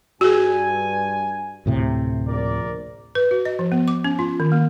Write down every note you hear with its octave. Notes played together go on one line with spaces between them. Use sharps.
G2 F#4 G#4 G#5
D2 A2 C3
A#1 A#4 D5
B4
F#4
D#5
F3
B3
D6
C#4
F4
D#3
A#3